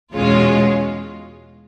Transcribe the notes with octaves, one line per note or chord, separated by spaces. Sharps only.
E2 B2 G#3 C#4 F4